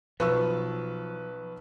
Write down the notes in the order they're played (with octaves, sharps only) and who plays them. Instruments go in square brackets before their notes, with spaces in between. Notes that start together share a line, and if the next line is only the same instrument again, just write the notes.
[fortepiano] B1 [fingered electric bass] F3 [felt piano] B4 C#6 E6